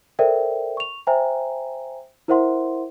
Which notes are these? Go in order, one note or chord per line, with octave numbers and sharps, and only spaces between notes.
A4 A#4 C5 D5 E5 G5
C#6 F7
C5 E5 G5 G#5 A#5
E4 A#4 C5 E5 F#5 C6